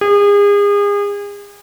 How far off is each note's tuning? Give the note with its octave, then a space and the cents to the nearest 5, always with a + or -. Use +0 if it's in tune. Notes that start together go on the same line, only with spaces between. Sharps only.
G#4 -35